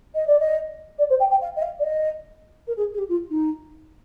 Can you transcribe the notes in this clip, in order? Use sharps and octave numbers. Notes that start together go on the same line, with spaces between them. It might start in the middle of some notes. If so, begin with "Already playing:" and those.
D#5
D5
D#5
D5
C5
G5
G5
F5
D#5
F5
D5
D#5
A#4
G#4
G#4
G4
F4
D#4